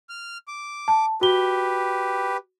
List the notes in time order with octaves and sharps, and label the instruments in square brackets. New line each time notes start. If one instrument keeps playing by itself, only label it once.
[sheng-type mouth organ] F6
D6
[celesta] A5
[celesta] F#4 G7 [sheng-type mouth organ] G4 B4